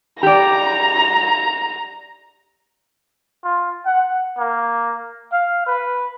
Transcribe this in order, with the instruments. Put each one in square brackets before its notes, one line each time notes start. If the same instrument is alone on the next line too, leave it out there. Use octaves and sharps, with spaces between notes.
[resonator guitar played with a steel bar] G4 D5 [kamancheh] A#5
[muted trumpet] F4
F#5
A#3
F5
B4